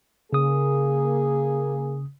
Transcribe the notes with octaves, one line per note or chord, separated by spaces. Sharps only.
C#3 A#3 G#4 D#6